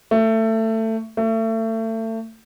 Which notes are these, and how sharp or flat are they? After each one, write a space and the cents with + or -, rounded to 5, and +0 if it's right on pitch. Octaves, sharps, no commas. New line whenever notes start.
A3 +20
A3 +30